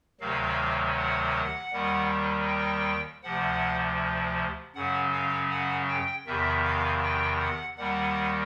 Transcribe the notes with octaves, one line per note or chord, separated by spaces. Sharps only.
D2 C3 D#3 F#3 F5
F#5
D#2 D#3 G3
G5
D2 C3 F3 F#5
F#2 C#3 F#3 F#5
F5
F#5
G5
E2 C3 D#3 E5
F5
G5
F#5
D#2 D#3 G3 F#5